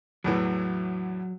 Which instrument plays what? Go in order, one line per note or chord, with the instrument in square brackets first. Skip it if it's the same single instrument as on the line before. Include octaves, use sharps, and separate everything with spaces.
[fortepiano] E2 A2 E3 [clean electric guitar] F#3